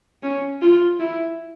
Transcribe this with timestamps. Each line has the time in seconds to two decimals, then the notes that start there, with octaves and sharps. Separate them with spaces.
0.23 C#4
0.62 F4
1.00 E4